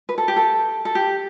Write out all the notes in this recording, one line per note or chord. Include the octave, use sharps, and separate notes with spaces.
B4
A4
G4
A4
A4
G4